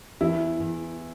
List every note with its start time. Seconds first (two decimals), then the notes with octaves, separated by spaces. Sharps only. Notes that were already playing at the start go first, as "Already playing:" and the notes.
0.21 E2 E4
0.60 E2